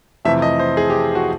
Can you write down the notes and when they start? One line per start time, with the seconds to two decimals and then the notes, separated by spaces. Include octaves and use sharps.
0.25 F2 C3 E3 A3 E5
0.42 D#5
0.59 C5
0.77 G#4
0.90 G4
1.15 F#4